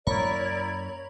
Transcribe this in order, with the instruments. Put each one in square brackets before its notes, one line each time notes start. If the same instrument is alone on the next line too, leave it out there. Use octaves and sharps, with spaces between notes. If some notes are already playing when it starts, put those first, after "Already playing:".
[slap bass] F#2 A#3 [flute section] E4 A#4 D5 [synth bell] C#5 A#5 B5